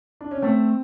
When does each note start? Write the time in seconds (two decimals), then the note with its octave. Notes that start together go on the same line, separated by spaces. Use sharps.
0.21 D4
0.31 C#4
0.42 A3 C4